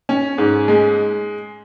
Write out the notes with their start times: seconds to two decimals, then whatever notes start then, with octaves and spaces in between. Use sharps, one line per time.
0.09 C#4
0.38 G#2
0.68 G#3